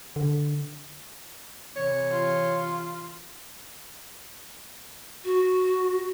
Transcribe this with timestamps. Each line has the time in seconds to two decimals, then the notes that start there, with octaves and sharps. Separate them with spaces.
0.16 D3
1.76 C3 E3 C#5
2.10 F4
5.24 F#4